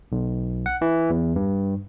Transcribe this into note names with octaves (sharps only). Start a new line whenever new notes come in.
B1
F#5
E3
E2
G2